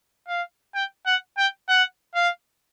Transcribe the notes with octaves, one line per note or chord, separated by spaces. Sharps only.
F5
G5
F#5
G5
F#5
F5